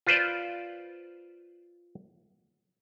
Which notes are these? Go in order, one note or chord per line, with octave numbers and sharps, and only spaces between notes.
F4 B4 C5 D5